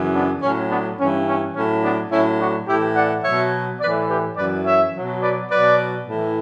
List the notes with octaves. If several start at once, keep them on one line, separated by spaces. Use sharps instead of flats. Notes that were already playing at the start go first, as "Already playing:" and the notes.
Already playing: F#2 C#3 E3
B3 D4
A2 F#3 C#4
B3 D4
G2 E3 C#4
C#4
A2 F#3 C#4
B3 D4
A2 F#3 C#4 E4
D4 F#4
A2 E3 E4 G4
D5 F#5
B2 F#3 C#5 E5
A2 E3 B4 D5
G4 B4
F#2 E3 B4 D5
C#5 E5
B2 F#3
B4 D5
B2 F#3 B4 D5
A2 E3